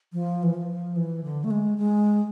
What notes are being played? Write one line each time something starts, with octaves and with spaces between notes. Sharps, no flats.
F3
E3
F3
E3
D3
A3
G#3
G#3